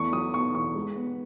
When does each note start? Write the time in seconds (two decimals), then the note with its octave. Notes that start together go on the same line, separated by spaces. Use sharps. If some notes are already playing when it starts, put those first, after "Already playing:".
Already playing: E2 A3 C#6
0.12 F#3 D#6
0.34 B3 C#6
0.54 E2 C#6
0.75 G#3
0.96 B3